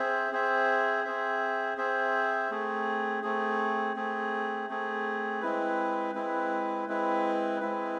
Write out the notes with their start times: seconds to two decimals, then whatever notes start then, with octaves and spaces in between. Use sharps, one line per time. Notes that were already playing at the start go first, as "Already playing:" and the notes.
Already playing: C4 G#4 C5 E5
0.32 C4 G#4 C5 E5
1.04 C4 G#4 C5 E5
1.78 C4 G#4 C5 E5
2.50 A3 C4 G#4
3.23 A3 C4 G#4
3.96 A3 C4 G#4
4.69 A3 C4 G#4
5.42 G#3 C4 E4 B4
6.15 G#3 C4 E4 B4
6.88 G#3 C4 E4 B4
7.60 G#3 C4 E4 B4